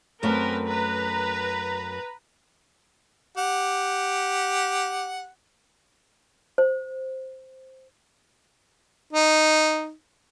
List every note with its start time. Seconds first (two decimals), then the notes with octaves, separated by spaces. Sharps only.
0.23 F#2 A3 C4 A#4 B4
0.66 B4 A#5
3.38 G4 F#5
6.58 C5
9.13 D#4